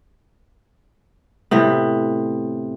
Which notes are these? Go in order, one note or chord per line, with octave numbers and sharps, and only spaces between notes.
A2 C3 B3